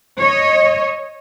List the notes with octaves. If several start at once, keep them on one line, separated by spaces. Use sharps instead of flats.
C#5 D#5